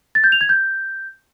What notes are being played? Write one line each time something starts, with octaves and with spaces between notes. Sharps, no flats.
A6
G6
F7
G#6
G6